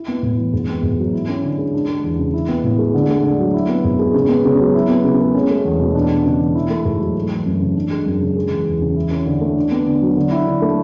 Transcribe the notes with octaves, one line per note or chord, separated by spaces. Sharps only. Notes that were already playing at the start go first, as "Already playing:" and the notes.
Already playing: E4
B3
A2
E3
G#2
B3
G#2
F#3
E4
C#4
D3
G#3
D4
G#3
E2
C#3
E4
B3
A2
G#3
D3
A3
D3
F#3
E4
B3
G#2
G#3
C#3
B3
C#3
F#3
E4
B3
C#3
G#3
C#4
A3
E2
B2
D4
G#3
C#3
E3
E4
A3
G#2
F#3
A3
E3
F#2
C#3
D4
G#3
F#2
C#3
G#3
E3
E2
C#3
E4
C#4
D3
A3
D4
B3
D3
F#3
D3
E4
D3
A3